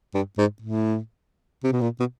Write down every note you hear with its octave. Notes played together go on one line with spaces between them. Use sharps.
G2
G#2
A2
C3
B2
A#2
B2